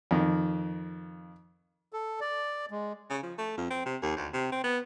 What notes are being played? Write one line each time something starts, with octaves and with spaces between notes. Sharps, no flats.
F2 D#3
A4
D5
G#3
C#3
F3
A3
F2
C4
C3
D#2
D2
C3
C4
B3